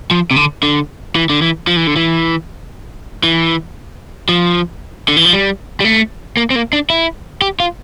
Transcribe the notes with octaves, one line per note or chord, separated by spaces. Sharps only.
F3
C3
D3
D3
E3
D3
E3
F3
E3
D3
E3
E3
F3
D3
E3
F3
G3
G3
A3
A#3
C4
A#3
D4
E4
G4
F4